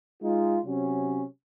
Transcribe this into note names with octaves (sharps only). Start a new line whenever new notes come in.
G#3 D#4 F4
C3 F#3 C#4